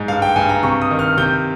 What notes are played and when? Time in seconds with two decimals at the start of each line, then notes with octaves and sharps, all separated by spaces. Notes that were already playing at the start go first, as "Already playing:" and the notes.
Already playing: G#2
0.08 G2 F5
0.22 G5
0.36 G2 G#5
0.49 A#5
0.63 C3 C#6
0.82 D#6
0.91 D#3
0.99 F6
1.17 C3 G6